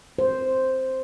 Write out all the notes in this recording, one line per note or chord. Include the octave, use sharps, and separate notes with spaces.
C5